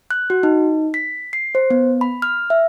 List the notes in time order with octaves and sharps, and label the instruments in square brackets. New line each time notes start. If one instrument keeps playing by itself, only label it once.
[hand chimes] F#6
F#4
D#4
B6
C7
C5
B3
B5
F6
E5